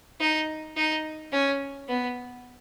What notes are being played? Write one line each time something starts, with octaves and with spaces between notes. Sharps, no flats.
D#4
D#4
C#4
B3